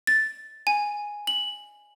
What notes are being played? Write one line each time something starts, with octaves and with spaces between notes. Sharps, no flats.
A6
G#5
F#7